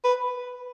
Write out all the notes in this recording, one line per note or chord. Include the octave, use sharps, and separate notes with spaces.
B4